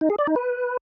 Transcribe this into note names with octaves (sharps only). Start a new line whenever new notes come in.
D#4
G#4
D5
D#4
B4